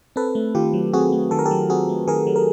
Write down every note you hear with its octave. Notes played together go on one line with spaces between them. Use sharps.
C4 A4 B4
A3
D#3 F4 G4
F#3
C4 F#4 G#4
A3
D#3 A4
A#4
G4 A4
F#3
C4 F#4 G#4
A3
D#3 G#4 A#4
F#3
A#4